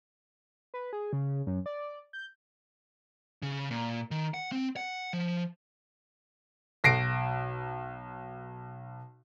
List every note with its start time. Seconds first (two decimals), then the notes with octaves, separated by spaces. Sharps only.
0.74 B4
0.93 G#4
1.13 C#3
1.47 F#2
1.66 D5
2.13 G6
3.42 C#3
3.71 A#2
4.11 D#3
4.34 F#5
4.52 C4
4.76 F#5
5.13 F3
6.84 B1 A#6 C7 D7